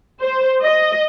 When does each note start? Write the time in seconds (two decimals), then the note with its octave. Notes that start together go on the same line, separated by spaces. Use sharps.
0.21 C5
0.62 D#5